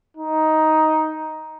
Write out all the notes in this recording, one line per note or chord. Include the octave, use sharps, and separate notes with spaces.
D#4